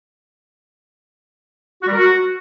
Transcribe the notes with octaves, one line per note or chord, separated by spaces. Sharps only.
F#4
G3
A#4
F#4